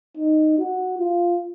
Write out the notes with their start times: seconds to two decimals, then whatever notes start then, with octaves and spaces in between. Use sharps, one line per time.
0.17 D#4
0.59 F#4
0.99 F4